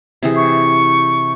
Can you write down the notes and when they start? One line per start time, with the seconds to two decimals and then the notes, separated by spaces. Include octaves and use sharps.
0.23 C3 E3 G#4
0.36 C#6